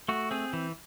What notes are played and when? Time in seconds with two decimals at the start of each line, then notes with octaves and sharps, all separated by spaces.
0.08 A3 F#4
0.31 C4 G#4
0.53 E3